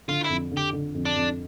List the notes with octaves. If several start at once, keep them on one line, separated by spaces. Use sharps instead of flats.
D3 F4
F2 E4
D3
G4
D3
F2
D4
F2